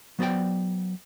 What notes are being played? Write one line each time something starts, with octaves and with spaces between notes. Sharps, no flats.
F#3 B3 C5 D5 G5